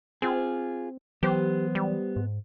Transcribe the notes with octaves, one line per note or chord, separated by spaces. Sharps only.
C4 F4 G#4
E3 F#3 B3 G4 C5
G3
G#2